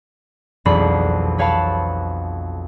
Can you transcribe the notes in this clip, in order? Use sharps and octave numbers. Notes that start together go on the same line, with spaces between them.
E1 B1 F2 D5 B5 C7
B4 C#5 F5 G5 A5 B5